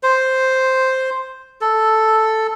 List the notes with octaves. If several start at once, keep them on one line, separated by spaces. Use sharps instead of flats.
C5
A4